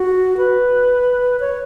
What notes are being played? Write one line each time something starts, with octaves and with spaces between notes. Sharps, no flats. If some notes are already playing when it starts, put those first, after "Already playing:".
Already playing: F#4
B4
C#5